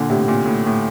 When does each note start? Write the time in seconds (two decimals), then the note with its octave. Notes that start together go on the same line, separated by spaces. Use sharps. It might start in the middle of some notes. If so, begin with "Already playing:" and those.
Already playing: A#2 D3
0.09 A2 C3
0.28 A#2
0.45 A2
0.66 A2